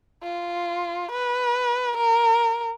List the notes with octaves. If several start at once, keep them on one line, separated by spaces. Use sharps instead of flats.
F4
B4
A#4